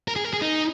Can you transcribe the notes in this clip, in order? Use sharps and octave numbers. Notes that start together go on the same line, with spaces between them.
A#4
G#4
A#4
G#4
D#4